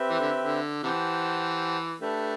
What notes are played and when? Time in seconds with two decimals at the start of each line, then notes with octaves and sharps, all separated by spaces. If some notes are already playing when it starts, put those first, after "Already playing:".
Already playing: C4 G4 B4 E5
0.10 E3
0.20 D3
0.41 D3
0.82 C3 E3 G4 C5 F#5 A5
2.01 A3 D4 G4 B4